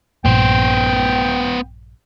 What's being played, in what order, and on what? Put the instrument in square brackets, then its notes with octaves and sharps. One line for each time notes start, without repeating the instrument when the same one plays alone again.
[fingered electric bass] A#1 G2 A#2 [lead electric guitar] B3 C5 [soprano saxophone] G5